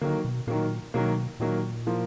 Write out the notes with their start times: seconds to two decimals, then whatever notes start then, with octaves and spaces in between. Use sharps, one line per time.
0.01 D3 D#3 F#3 A#3
0.25 B2
0.47 A#2 D#3 F#3 A#3
0.94 B2 D#3 F#3 A#3
1.40 A#2 D#3 F#3 A#3
1.87 F3 A#3 F4